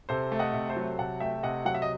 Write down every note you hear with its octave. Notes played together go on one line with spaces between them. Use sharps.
C3 A4 C5
A3
D#5 F#5
C3
A4 C5
F#3
C3 F#5 A5
A3 E5 G5
C3 D#5 F#5
F#3 F#5
E5
D#5